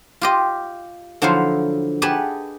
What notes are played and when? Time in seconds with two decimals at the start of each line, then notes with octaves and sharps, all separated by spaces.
0.21 F4 G4 D#5
1.22 D3 F3 F#3 E4 C5 F5
2.02 G4 G#4 B4 D#5 F#5 A5